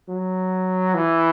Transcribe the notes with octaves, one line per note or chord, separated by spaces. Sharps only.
F#3
E3